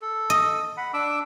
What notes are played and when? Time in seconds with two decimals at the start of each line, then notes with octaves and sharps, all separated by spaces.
0.02 A4
0.30 D#5
0.77 F#5 B5
0.93 D4 D6 E6